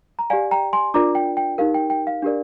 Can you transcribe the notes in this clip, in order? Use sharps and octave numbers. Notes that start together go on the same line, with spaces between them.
A#5
G4 D5 F5 G#5
G5 A#5
G#5 C6
D4 F4 A#4 D5 A#5 D6
G5
G5
D#4 G4 A#4 F5
G5
G5
F5
D4 G4 A#4 D5